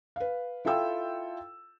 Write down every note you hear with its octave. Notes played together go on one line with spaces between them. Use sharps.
B4 F5
E4 F4 A4 F5 G5 E6